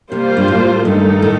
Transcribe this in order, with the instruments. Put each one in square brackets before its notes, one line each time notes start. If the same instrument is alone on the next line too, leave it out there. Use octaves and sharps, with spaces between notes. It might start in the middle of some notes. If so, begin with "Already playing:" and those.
[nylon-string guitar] C3 [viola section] G3 A#3 F4 C5
[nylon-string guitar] G2
A2
[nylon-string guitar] G2 [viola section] D#3 A3 D#4 A4
[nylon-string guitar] A2